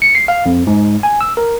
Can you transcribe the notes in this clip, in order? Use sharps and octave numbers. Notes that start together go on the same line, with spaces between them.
C#7
C7
F5
F2
G#2
G#5
E6
A#4